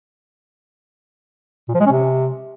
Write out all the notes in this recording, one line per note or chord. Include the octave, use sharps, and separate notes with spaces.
A#2
F3
G#3
C#4
C3